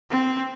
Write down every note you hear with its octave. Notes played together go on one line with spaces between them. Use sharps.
C4